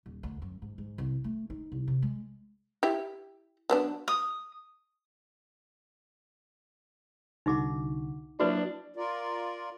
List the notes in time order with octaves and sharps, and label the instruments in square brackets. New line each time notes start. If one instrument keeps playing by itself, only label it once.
[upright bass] D#1
D2
F#2
G#2
G#2
C2
A3
D#4
C2
C3
G#3
[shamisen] E4 G4
F#3 B3 D4
[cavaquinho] D#6
[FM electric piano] C2 D3 F#4 [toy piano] D#4 E5 D6
[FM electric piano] F#3 A#3 E4 [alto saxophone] D4 [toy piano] F#4 B4 D5
[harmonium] F4 A#4 D5